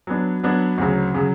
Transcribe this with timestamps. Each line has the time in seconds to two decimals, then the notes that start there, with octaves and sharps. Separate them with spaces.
0.07 F#3 B3 D4
0.43 F#3 B3 D4
0.78 D2 C#3 F#3
1.14 C#3 F#3